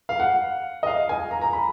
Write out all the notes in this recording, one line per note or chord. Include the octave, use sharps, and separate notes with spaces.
F5
F#5
D#5
F5
G#5
A#5
A#5
B5